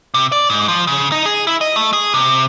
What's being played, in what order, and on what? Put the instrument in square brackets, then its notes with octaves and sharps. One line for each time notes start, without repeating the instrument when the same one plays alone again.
[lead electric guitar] C3
D5
G#2
F3
C#3
D#4
G#4
E4
D#5
A3
G#4
C3